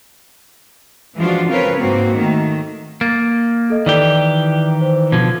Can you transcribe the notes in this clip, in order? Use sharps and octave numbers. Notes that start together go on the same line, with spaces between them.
E3 F3 G#3 D4 F4 F#4
C#3 C4 F4 A#4 B4 C#5
G#2 A#3 C4 F#4
D#3 A3 A#3
A#3 A6
A4 D#5
D#3 E3 G4 D5
C5
B2 D3 F3 G#6